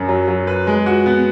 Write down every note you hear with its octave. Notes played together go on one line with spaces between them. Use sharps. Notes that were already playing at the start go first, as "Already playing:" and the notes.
Already playing: F#2
F#3
F#3
B4
G#3
F#4
B3